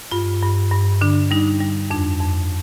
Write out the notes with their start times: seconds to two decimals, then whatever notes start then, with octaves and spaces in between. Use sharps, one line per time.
0.11 G2 F4
0.42 G2
0.72 G2
1.01 D3 D4
1.31 G3 D#4
1.60 G3
1.91 F2 D4
2.21 F2